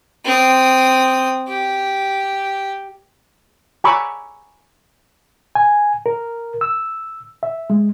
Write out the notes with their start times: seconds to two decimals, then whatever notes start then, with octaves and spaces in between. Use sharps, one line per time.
0.25 C4 D#6
1.48 G4
3.84 G#5 A#5 B5 C#6 D6 E6
5.55 G#5
6.06 A#4
6.61 E6
7.43 E5
7.70 G#3